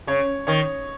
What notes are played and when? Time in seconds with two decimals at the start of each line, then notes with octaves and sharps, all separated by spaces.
0.07 C#3 C#5
0.47 D#3 C#5